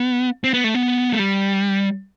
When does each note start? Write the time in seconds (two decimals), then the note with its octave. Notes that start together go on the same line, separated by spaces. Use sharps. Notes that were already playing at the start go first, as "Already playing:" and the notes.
Already playing: B3
0.44 C4
0.54 B3
0.64 A3
0.75 B3
1.13 A3
1.19 G3